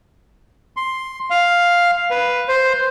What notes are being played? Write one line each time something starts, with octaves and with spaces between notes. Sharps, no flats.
C6
F5
B4
C5